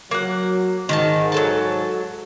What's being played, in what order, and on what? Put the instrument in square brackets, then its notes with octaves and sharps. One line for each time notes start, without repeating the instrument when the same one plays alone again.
[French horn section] F#3 [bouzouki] A#3 F#5
[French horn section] G#2 [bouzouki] D#3 D5 A5
[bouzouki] F#3 A4 A5